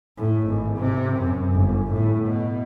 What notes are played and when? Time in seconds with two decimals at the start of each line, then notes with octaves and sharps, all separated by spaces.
0.17 A2
0.48 G#1
0.78 C3
1.17 F#2
1.52 G1
1.92 A2
2.25 B2